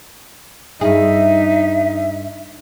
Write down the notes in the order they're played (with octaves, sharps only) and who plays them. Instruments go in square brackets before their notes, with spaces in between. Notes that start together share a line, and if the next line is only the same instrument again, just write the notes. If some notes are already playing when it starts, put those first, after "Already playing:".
[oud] G2 G#4 [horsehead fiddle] D#4 [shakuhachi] E5